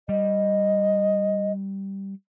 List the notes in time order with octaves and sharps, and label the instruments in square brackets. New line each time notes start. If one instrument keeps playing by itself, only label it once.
[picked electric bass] G3 [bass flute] D#5